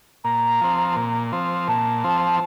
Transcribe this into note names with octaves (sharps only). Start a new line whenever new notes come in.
A#2 A#5
F3 C4
A#2
F3 C4
A#2 A5
F3 C4